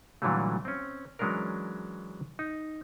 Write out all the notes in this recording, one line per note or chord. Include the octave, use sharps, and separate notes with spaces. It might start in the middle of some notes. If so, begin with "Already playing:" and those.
A#2 D3 E3 F#3 G3 A3
C4 C#4
E3 F#3 G#3 C#4 D4 A#4
D#4